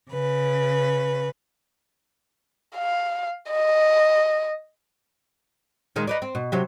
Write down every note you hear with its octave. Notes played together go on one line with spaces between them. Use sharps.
C#3 B4
F5
D#5
A#2 D#3 G#3
D#4 B4 D5
C4
B2
C3 F#3 G4